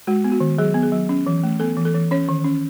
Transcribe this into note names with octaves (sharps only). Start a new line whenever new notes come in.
G#3 F#4
B3
F#4
D#3
F#3 G#4
B3
G#4
F#3
C#4
E3
A3
B3 A4
E3
A4
E3
C#4 C#5
D#3
C#4